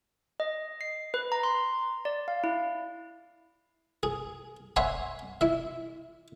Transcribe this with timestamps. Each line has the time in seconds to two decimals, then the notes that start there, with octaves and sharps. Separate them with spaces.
0.40 D#5
0.81 C7
1.14 B4
1.32 A#5
1.43 C6
2.05 D5
2.28 F5
2.44 E4
4.03 G#4
4.76 C#5 E5 F#5 G#5 B5 C6
5.41 E4 E5